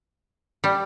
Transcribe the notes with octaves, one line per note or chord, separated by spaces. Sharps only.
G3